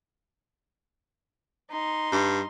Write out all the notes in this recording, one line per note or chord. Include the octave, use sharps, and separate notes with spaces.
D#4 C6
G2